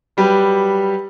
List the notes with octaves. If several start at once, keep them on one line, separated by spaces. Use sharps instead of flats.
F#3 G3 G4 B4